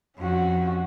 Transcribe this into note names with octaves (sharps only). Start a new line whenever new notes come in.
F2 C#4 F#4